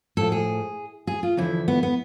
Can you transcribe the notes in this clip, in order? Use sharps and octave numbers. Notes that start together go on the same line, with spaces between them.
A2 F3 A4
G#4
G#4
F4
E2 D3 F3 E4
B3
B3